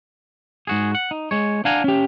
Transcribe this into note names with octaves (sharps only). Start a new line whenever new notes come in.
G#2 F#4 G#4
F#5
D#4
G#3 C#5
D4 F5 F#5 G#5 A#5
C#4 G4